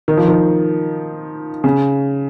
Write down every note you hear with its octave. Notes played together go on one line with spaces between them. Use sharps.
D#3
F3
D#3
C#3